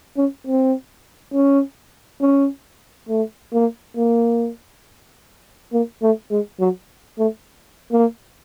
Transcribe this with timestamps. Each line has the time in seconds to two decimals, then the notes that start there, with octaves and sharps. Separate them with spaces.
0.17 C#4
0.47 C4
1.33 C#4
2.21 C#4
3.09 A3
3.53 A#3
3.97 A#3
5.73 A#3
6.02 A3
6.31 G#3
6.60 F#3
7.18 A3
7.92 A#3